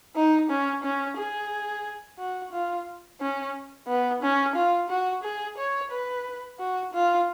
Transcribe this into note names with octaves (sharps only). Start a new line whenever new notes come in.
D#4
C#4
C#4
G#4
F#4
F4
C#4
B3
C#4
F4
F#4
G#4
C#5
B4
F#4
F4